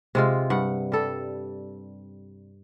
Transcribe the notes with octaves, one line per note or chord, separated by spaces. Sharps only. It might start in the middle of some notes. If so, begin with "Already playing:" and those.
C3 G#3 F4
G2 F#5
G3 A4